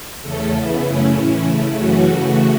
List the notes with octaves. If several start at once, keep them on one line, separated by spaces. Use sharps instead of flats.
E2 C#3 A3 C#4 A4
C#3 E3 B3 E4
F#2 C#3 A3 C#4 E4
A2 E3 C#4 E4
C#3 A3 E4
F#2 C#3 E3 A3 C#4 F#4
C#3 E3 A3